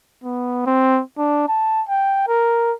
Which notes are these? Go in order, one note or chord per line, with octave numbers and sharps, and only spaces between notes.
B3
C4
D4
A5
G5
A#4